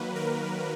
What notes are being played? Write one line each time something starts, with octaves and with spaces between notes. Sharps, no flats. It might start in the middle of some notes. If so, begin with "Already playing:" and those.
Already playing: D#3 F#3 A#3 B4
A#4